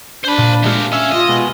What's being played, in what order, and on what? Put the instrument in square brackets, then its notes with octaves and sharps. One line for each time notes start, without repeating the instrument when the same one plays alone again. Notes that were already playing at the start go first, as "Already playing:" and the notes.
[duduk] D4 [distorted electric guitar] C5 B5
[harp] A#2
[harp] G#3 F4 [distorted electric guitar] A3 G4
[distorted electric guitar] C#4 [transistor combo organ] E5 F5 E6
[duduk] F4 [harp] G4 [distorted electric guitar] D#5
[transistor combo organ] B2 G#3